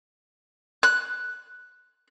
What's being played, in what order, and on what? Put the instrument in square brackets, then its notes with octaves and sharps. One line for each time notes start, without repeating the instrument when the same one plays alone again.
[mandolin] F#6